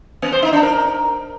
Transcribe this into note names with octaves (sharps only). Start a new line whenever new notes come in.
B3
C5
D#4
D4
A#4